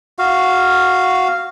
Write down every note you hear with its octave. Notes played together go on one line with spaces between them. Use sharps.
F#4 F5